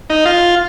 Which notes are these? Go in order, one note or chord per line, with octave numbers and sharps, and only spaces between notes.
D#4
F4